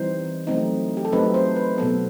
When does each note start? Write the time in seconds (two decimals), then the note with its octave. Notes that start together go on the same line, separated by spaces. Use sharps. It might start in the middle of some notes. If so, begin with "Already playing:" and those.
Already playing: E3 G3 C4 D#4 C5
0.47 F#3 A3 C4 D#4
0.97 G4
1.05 A4
1.12 F#3 A3 C4 D#4 B4
1.34 C5
1.56 B4
1.78 B2 F#3 B3 A4